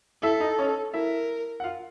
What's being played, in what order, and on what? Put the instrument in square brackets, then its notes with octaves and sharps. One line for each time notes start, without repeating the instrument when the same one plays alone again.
[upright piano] E4 E5 [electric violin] A4
[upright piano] D#4 D#5
C#4 C#5
[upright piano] E4 E5 [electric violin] A#4
[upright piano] F#5
F4 F5